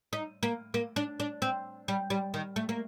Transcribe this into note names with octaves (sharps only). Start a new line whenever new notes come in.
D#4
A#3
A#3
D4
D4
C4
G3
G3
D#3
A3
A#3